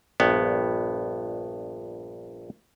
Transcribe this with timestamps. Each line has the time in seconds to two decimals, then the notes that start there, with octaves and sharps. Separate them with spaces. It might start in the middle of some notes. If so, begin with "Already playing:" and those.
0.20 A#1 G2 B3